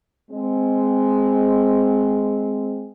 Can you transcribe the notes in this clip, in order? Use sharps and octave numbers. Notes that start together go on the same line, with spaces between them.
G#3 C4